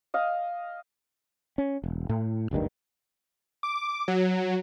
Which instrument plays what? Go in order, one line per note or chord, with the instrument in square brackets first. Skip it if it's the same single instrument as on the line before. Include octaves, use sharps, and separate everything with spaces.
[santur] D#5 F5
[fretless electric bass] C#4
E1
A2
F#1 D2 G2 D#3
[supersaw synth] D6
F#3